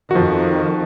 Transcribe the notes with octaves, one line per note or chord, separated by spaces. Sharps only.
F2 D#3 F3 F#4